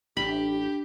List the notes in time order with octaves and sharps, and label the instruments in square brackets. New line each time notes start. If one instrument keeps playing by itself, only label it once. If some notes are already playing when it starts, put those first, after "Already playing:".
[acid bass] A1 [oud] D4 [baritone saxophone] G4 [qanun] B5